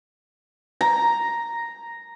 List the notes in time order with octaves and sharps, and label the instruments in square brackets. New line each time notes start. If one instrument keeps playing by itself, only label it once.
[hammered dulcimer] A#5